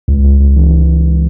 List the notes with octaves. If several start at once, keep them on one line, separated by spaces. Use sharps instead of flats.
C#2
C#2
C#2
E3